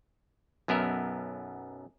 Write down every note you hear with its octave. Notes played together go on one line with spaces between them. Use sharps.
B1 F#2 B3 A#4 E5